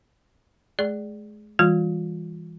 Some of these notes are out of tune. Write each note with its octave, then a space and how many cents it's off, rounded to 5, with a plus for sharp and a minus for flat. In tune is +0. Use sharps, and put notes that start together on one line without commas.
G#3 +35 G#4 +0 D5 +0
E3 +0 G3 +40 F4 +30